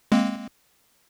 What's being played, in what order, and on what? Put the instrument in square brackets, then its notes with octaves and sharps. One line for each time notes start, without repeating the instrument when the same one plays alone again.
[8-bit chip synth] G#3 A#3 C4